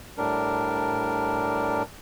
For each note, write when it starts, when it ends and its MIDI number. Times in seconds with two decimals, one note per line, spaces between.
0.18 1.83 45
0.18 1.83 55
0.18 1.83 62
0.18 1.83 70